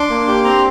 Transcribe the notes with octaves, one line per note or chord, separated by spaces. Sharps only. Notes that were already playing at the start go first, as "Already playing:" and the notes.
Already playing: D4 C6 D6
A#3
G4
C4 A#5 C6